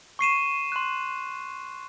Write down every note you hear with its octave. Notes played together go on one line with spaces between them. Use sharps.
C#6 C7 D#7 E7
C6 F#6